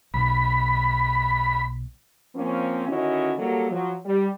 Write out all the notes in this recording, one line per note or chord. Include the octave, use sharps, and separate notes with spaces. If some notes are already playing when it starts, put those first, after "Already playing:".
B1 B5
F3 A#3 C4 C#4
D3 D#3 C#4 E4 F#4 D#5
F#3 G3 A#3 A4
F3 F#3
G3